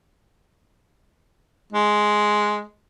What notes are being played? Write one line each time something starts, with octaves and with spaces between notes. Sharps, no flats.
G#3